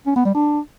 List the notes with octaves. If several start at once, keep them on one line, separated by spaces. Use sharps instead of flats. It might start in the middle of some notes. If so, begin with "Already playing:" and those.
C#4
B3
G3
D4